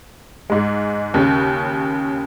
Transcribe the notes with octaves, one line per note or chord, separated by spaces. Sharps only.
G#2 G#3
D#2 C#3